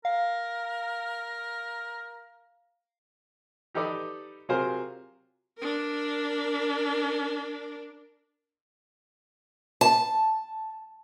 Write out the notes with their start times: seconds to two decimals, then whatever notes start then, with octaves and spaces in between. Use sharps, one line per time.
0.05 A#4 F5
3.75 D#4 G4 A4 B4 D5 D#5
4.49 C3 F#3 F4 G#4 A#4 C5
5.57 D4 A#4
9.81 A5